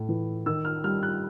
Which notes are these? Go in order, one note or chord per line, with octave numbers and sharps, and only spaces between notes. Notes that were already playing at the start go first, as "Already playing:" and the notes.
Already playing: A2
E3
D#3 E6
F6
G3 F6
F#6